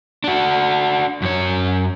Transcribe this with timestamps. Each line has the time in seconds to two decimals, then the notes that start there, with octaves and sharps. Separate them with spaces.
0.24 D4 F#4
1.22 F#2 C#5